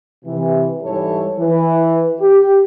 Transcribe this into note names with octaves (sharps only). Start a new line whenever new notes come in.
C3 E3
G#2 E3 G3 E4 A4 C#5
E3 B4
G4